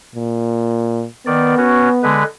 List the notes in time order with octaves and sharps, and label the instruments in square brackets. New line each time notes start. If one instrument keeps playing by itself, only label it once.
[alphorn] A#2
[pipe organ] D#3 D5 [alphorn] B3
[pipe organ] C#4 F#4
D3 G#3 B4